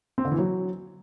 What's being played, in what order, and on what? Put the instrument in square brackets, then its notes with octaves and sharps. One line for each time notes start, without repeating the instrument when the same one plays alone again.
[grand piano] C4
D3
E3
F#3